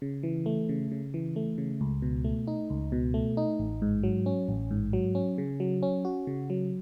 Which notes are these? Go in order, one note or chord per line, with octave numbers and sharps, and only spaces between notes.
C#3
E3
A3
C#3
C#3
E3
A3
C#3
C#2
B2
A3
D#4
C#2
B2
A3
D#4
A1
G#2
F#3
C#4
A1
G#2
F#3
C#4
C#3
F#3
C#4
F#4
C#3
F#3